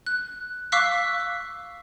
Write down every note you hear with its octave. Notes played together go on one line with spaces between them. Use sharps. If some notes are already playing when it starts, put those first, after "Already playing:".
F#6
F5 C#6 D6 E6 F#6 B6